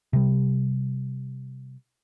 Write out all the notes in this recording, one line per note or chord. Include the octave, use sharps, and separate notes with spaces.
C3 G3